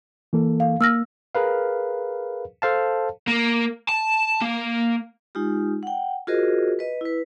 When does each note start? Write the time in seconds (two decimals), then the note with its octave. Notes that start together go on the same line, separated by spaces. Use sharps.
0.33 E3 A#3 A4
0.60 F5
0.81 A#3 E6 F6 A#6
1.35 G#4 A#4 B4 F5
2.62 A4 C5 F5 A5
3.28 A#3
3.88 A5
4.42 A#3
5.35 G#3 D#4 F4 G4
5.83 F#5 G5
6.27 F4 F#4 G#4 A#4 C5 D#5
6.79 B4 D#5
7.01 E4 B4